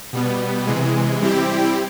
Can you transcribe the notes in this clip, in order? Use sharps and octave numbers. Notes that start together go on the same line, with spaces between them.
B2 G3 B3
C3 E3 G#3
G3 C4 E4 G4